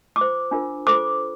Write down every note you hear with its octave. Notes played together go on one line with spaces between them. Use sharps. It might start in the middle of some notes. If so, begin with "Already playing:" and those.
F4 D6
C5
D4 F4 A#4
F4 A4 C5 D6